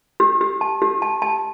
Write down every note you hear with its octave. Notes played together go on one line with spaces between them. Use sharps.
G4
G4
A5
G4
A5
A5